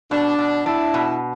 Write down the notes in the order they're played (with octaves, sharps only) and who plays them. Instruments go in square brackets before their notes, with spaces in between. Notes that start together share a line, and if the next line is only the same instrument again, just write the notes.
[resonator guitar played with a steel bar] B2 [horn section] D4
[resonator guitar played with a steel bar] B2
[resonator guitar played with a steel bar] D4 [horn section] E4
[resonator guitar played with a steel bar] B2